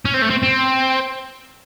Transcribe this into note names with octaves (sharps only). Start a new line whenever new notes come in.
C#4
C4
A3
C4
C4